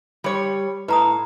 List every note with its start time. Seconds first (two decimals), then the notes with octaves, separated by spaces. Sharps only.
0.24 G3 C#5
0.88 A2 B4 A#5 D#6